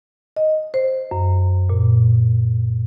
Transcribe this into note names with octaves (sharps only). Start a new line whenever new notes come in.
D#5
C5
F#2
A#2